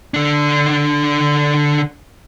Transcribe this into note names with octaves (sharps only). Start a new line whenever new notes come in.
D3 D4